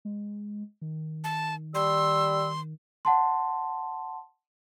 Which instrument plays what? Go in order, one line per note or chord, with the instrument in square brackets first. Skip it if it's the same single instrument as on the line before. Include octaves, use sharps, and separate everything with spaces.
[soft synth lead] G#3
D#3
[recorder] A5
[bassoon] G3 [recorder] C6 [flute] E6
[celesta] F#5 A5 C6